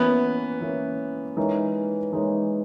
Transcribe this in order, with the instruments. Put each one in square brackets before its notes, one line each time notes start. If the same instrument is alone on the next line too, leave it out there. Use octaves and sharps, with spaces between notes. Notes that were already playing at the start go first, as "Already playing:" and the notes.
Already playing: [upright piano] E3 A#3 C#4 [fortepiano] B3
[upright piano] E3 A#3 C#4
E3 G#3 D#4 A#4 C#5
E3 G#3 D#4 A#4 C#5